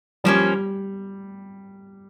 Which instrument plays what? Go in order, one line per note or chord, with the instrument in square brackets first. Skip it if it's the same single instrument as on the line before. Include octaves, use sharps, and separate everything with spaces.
[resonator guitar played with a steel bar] F3 A#3 C#4 [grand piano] G3